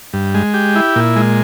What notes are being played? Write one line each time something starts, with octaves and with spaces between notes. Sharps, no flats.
G2
G#3
G4
E4
A#2
G#3